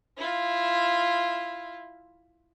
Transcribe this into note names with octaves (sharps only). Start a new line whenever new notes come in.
E4 F4